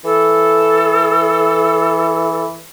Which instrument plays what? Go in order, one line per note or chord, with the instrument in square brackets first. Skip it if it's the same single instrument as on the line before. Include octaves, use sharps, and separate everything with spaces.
[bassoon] E3 [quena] A4